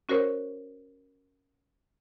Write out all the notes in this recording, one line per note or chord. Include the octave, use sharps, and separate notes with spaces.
C#4 F#4 A#4 C5 C#5